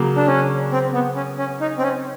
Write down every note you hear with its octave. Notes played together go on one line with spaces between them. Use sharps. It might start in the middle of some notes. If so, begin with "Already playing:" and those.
Already playing: C#3 F#3 A#3
D4
C#4
C4
B3
C#4
C#4
D#4
C4
C#4